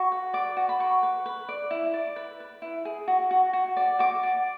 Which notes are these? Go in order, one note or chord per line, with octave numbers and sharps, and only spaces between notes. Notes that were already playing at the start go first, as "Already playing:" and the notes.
Already playing: F#4 C#6
B4
D5 D6
F#4
B5
B4 C#6
B4
B4
D5
E4
D5
B4
B4
E4
G#4
F#4
F#4
F#4
D5
F#4 D6
D5